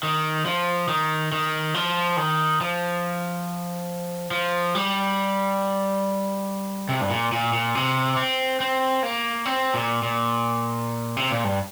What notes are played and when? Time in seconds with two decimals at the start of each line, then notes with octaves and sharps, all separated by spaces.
0.03 D#3
0.45 F3
0.88 D#3
1.32 D#3
1.74 F3
2.17 D#3
2.61 F3
4.31 F3
4.75 G3
6.89 C3
7.01 G2
7.10 A#2
7.32 A#2
7.53 A#2
7.75 C3
8.17 C4
8.60 C4
9.03 A#3
9.45 C4
9.74 A#2
10.03 A#2
11.17 C3
11.31 A#2
11.44 G2